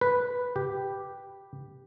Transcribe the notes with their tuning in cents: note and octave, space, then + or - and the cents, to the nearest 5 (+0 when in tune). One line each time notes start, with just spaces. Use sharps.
B4 -5
G4 +0